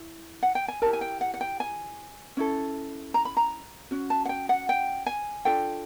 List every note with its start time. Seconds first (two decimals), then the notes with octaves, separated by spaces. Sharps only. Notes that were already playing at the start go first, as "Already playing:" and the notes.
Already playing: E4
0.43 F#5
0.55 G5
0.68 G#5
0.82 E4 G4 A#4 A5
0.93 G#5
1.01 G5
1.21 F#5
1.34 F#5
1.41 G5
1.60 G#5
2.37 C#4 E4 A4
3.14 A#5
3.25 B5
3.37 A#5
3.91 C#4 F#4
4.10 A5
4.25 F#5
4.29 G5
4.49 F#5
4.69 G5
5.06 G#5
5.45 D4 F4 A4 G5